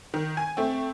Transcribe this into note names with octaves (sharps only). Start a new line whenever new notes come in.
D#3
G#5
A3 C4